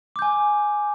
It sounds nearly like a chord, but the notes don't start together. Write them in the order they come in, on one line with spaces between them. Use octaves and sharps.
D6 G6 G#5